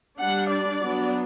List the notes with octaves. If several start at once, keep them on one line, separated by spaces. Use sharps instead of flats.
G3 D4 F#5
D5
F#3 B3 D4